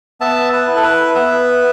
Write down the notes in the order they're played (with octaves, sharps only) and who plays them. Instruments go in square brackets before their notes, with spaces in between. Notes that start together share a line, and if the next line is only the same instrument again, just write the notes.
[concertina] B3 E5 A5
B4
E4
A4
B4
B3 B4 E5